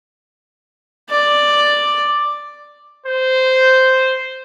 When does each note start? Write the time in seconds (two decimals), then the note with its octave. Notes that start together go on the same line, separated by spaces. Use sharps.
1.10 D5
3.06 C5